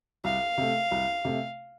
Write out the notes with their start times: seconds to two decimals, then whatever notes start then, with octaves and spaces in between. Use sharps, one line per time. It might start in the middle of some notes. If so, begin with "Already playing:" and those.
0.24 C2 F5
0.58 C3 A3
0.91 C2
1.25 C3 A3